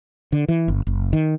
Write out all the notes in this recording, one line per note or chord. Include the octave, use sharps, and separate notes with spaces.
D3
E3
G1
F#1
D#3